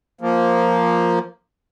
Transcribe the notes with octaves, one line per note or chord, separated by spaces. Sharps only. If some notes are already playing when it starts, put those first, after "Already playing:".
F3 A#3